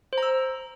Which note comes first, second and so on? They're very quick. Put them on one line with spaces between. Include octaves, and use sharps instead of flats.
C5 A#5 E6